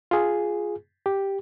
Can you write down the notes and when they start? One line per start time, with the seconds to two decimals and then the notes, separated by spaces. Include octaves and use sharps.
0.11 F4 G#4
1.06 G4